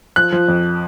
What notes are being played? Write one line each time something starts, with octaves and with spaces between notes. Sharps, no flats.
F3 F#6
F3
F2